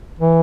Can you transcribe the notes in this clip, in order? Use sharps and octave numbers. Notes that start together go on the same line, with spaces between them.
E3